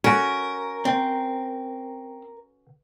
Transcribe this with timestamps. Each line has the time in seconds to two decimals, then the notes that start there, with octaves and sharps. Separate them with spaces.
0.04 C#4 F#4 A#4
0.85 C4